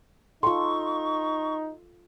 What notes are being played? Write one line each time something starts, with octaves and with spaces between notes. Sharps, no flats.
D#4 F4 A4 G5 C6 C#6